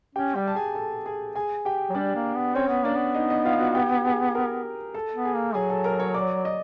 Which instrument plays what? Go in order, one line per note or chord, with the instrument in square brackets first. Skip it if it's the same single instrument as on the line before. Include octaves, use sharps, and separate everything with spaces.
[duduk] C#4 [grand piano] G4 G5
[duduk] G3 [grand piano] G4 G5
[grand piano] A5
G#4 G#5
A4 A5
G#4 G#5
G#4 G#5
G4 G5
[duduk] F#3
[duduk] G3 [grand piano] D4 D5
[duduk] A#3
B3
[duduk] C4 [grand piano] C#4 C#5
[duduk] B3
[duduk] A#3 [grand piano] D4 D5
[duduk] B3
[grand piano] D#4 D#5
D#4 D#5
F4 F5
F#4 F#5
G4 G5
G#4 G#5
A#4 A#5
A4 A5
[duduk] B3
[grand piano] G#4 G#5
[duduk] A#3
[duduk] F#3 [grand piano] G#4 G#5
[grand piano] A4 A5
A#4 A#5
C#5 C#6
D5 D6
D#5 D#6